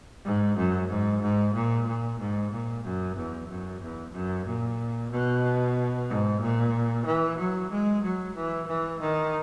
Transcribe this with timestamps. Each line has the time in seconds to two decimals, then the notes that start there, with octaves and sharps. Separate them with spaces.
0.25 G#2
0.57 F#2
0.89 G#2
1.22 G#2
1.54 A#2
1.87 A#2
2.19 G#2
2.52 A#2
2.84 F#2
3.16 E2
3.49 F#2
3.81 E2
4.13 F#2
4.46 A#2
5.11 B2
6.08 G#2
6.41 A#2
7.05 E3
7.38 F#3
7.71 G#3
8.03 F#3
8.35 E3
8.67 E3
9.00 D#3